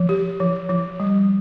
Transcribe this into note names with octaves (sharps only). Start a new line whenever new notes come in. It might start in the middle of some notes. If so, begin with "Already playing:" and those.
Already playing: F3
G4
F3
F3
G3